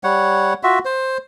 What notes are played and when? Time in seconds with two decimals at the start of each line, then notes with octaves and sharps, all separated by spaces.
0.04 G3 C#5 F#5
0.63 F4 F#4 E5
0.85 C5